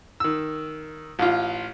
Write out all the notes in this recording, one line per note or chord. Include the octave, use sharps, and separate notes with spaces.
D#3 E6
A1 F4